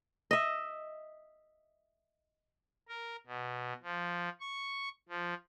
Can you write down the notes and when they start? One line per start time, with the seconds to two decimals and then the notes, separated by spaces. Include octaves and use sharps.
0.31 D#5 E5
2.88 A#4
3.27 B2
3.83 F3
4.40 C#6
5.09 F3